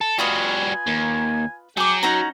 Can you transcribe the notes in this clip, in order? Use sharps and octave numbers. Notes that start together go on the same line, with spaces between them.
A4
G3 F4 F#4 B4 D#5 G#5
D#2
F#3 G#4 G5 D6
C#4 D#4 F#4 A#5